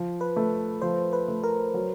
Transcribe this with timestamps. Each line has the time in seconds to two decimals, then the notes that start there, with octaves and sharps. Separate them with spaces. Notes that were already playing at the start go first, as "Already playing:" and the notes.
Already playing: F3
0.21 B4
0.36 A3
0.82 F3 C5
1.13 B4
1.28 A3
1.44 A#4
1.74 F#3